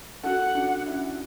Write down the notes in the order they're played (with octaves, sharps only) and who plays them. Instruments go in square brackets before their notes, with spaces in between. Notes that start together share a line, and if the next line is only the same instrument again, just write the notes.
[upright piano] F#4 A4 [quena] F#5
[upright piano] D4 F#4
C#4 E4